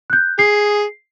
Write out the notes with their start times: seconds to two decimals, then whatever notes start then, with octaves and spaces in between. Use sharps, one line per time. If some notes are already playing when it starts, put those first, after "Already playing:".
0.10 F#6 G6
0.39 G#4 C7